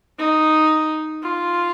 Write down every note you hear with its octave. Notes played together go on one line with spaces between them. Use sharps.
D#4
F4